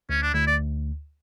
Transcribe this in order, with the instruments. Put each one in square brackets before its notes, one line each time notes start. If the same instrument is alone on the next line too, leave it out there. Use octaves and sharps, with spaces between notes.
[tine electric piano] D2 [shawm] C#4
[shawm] D4
[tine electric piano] D2 [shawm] E4
[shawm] D5